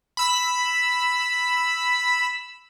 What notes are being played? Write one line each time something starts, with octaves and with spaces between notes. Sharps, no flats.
B5 E6 B6